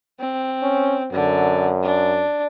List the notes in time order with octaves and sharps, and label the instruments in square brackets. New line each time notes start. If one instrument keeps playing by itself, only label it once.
[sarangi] C4
[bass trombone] C#4
[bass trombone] F#2 [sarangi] D3
[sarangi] D4